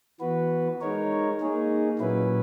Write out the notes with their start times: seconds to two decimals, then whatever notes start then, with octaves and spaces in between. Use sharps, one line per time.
0.20 E3 B3 F#4 B4
0.81 G#3 D#4 A#4 C#5
1.40 A#3 D#4 G#4
1.99 A#2 F#3 C#4 E4 B4